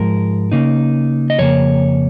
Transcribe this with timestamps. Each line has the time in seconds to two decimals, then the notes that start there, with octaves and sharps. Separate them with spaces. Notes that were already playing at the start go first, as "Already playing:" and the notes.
Already playing: G#2 F3 G#3 A#4
0.52 C#3 A#3 D#4
1.30 D#5
1.39 F2 C#3 A#3 C#5